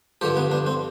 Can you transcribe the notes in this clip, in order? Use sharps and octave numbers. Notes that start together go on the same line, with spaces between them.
G2 D3 F3 G4
B3
D4
C4